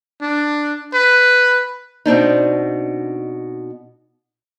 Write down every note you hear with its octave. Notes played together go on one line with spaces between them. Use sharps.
D4
B4
B2 C4 D4 D#4